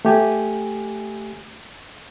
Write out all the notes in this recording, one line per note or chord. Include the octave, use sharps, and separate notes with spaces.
A3 G4 G#5